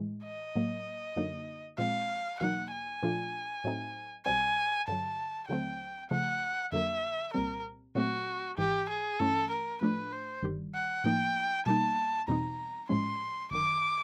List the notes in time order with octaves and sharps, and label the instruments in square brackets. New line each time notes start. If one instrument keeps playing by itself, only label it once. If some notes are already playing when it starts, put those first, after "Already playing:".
Already playing: [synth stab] A2 E3 G#3
[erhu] D#5
[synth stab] A2 F#3 A#3
F#2 D3 F#3 A#3 D#4
[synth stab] A#2 F3 G#3 C4 [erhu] F5
[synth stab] E2 B2 F#3 A#3 D#4 [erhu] F#5
[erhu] G#5
[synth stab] A#2 F3 A3 D4 F4
A2 F#3 A3 C4 D#4
[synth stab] B1 B2 G3 C4 [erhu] G#5
[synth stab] G2 D3 F#3 [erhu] A5
[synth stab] D#2 D3 F#3 A3 C4 [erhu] G5
[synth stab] C#2 C#3 F3 A3 [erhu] F#5
[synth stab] F2 D3 F#3 A#3 [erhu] E5
[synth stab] C2 A#2 G3 C4 [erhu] A#4
[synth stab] A#2 F#3 A3 C4 [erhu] F#4
[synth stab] G#1 G#2 E3 [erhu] G4
[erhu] G#4
[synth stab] G2 E3 A3 C#4 [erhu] A4
[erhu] A#4
[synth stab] A2 F3 A3 D4 [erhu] B4
[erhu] C5
[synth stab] G1 G2 D#3 G3
[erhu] F#5
[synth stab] A2 F3 A#3 D#4 [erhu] G5
[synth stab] B2 G3 A#3 D#4 [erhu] A5
[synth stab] E2 B2 G3 C4 D#4 [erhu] A#5
[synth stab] A#1 A2 F3 G#3 C#4 [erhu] C6
[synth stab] G1 F#2 D#3 [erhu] D6